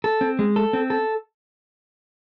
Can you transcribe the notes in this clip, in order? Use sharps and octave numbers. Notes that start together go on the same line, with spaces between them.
A4
C4
G#3
A4
C4
A4